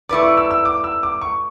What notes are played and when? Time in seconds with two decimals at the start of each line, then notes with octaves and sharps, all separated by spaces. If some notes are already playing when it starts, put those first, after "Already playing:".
0.09 A3 E4 B4 D5 D6
0.23 C#6
0.37 E6
0.51 E6
0.65 D6
0.84 E6
1.03 D6
1.21 C#6